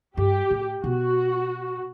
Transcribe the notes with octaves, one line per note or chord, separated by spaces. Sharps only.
G2 G4
A2
B2 F#4